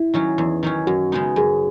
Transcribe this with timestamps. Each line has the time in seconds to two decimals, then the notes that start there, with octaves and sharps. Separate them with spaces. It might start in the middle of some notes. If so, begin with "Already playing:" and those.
Already playing: E4
0.14 D#3 F#3 C#4
0.38 E2
0.63 D#3 F#3 C#4
0.87 F#2 F#4
1.12 C#3 G#3 B3 D#4
1.36 F#2 G#4